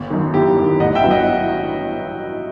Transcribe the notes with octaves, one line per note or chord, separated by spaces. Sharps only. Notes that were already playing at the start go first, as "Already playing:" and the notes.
Already playing: G1
F#2 D#3
G1 E4 G4
F#2
D#3
A1 D#5 F#5
E5 G5
G2 F#3 B3 E4
D#5 F#5